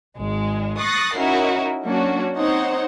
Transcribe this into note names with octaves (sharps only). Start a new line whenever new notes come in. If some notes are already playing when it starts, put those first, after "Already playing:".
G#1 G#3
C#6 D#6 F#6 A6 A#6 C7
C#4 D#4 E4 F#4 A#4
F#3 A#3 C#4 D4 F#4
C4 D#4 C5 C#5 F#5